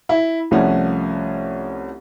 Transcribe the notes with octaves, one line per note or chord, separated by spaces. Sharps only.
E4 E5
C2 F3 A3 C#4 F#5